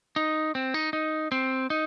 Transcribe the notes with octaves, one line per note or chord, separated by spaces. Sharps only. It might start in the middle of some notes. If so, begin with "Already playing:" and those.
D#4
C4
D#4
D#4
C4
D#4